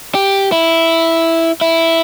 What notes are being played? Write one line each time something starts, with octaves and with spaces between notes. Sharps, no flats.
G4
E4
E4